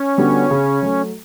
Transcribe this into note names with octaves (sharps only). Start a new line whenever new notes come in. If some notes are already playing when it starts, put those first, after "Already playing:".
Already playing: C#4
D3 G3 B3 F#4
C#3
F#3 A3